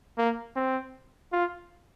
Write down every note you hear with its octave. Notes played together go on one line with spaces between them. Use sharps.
A#3
C4
F4